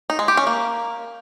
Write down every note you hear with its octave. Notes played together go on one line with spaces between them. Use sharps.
D#4
G#3
G4
C#4
A#3